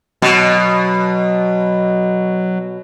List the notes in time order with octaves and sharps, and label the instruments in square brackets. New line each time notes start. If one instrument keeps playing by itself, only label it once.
[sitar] B2 [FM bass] F#3